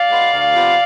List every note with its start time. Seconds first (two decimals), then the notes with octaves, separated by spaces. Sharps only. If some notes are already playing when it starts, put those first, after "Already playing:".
Already playing: D5 F5
0.10 G#3 B3 F4
0.32 D2
0.54 C3 F3 B3 F4